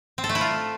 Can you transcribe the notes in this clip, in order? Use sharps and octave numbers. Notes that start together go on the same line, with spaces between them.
C4
A4
A3
E4
F4